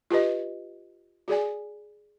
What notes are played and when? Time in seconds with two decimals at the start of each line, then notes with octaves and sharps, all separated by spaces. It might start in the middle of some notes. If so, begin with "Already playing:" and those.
0.11 F4 G4 B4 D#5
1.28 F#4 G#4 D5 G#5